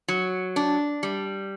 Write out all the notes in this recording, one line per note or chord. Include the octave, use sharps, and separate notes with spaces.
F#3
D4
G3